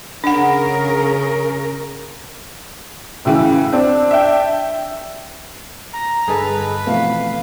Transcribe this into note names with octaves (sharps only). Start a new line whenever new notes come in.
C#3 D4 A#4 F#5
A2 C#3 E3
C4 D4
E5 G5
A#5
G2 D3 G#4 A4 B4 D#5 A5
B2 E3 F3 A3 B3 C4 F5